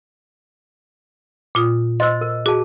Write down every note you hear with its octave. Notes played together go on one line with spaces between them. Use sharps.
A#2 F4 D#6
C5 D#5 C6 E6
A#4
F#4 G#4 A5